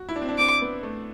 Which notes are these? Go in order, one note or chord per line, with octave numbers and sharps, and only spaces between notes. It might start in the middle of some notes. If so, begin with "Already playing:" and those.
Already playing: F#4
E4
D4
C4
D4
C4 D6
B3
A3